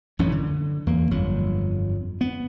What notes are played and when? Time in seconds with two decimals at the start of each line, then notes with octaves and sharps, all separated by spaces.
0.19 A1 F#2 A2 C#4
0.32 D3
0.87 E2 A#3
1.11 G1 F2 F#3
2.21 B3